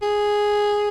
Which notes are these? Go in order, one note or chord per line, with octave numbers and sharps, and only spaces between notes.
G#4